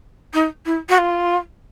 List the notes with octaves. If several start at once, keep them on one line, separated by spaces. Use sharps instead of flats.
D#4
E4
F#4
F4